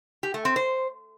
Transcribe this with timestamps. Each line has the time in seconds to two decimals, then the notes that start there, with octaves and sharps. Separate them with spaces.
0.23 G4
0.34 A3
0.45 C4
0.56 C5